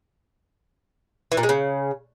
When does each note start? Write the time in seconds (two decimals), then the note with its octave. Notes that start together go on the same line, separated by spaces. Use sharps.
1.32 E3
1.37 A#2
1.43 G#3
1.49 C#3